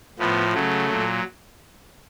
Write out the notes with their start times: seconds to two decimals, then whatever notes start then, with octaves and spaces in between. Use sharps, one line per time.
0.19 A2 F3 B3
0.54 C#3 F#3 A3
0.89 A#2 F#3